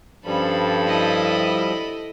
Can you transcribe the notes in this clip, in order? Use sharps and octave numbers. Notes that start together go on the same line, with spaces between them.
G2 F3 G3 C#4 A4 B5
E4 D#5